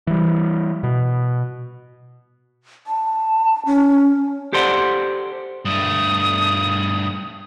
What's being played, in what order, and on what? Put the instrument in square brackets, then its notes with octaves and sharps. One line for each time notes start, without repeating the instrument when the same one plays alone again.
[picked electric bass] E3 G3
B2
[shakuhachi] A5
C#4
[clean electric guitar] G4 A4 C5 D5 F#5
[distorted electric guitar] G2 A3 [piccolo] D#6